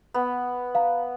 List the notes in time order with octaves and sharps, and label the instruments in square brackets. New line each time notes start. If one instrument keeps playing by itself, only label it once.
[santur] B3
[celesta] F5 A#5